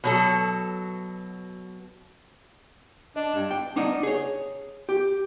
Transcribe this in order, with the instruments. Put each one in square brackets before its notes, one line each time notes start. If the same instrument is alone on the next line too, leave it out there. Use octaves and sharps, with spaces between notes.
[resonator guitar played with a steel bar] B2 F#3 A4
[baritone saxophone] D4 [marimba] D#5
[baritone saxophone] G2
[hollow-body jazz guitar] G5
A#3 D4 D#4 D#5 F#5
G#4 C#5
G4